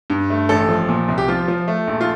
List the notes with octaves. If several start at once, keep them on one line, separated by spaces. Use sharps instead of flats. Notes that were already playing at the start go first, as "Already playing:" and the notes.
G2
A3
A1 A4
F3
A#2
C2
G4
F3 F4
F3
A3
A#1
F4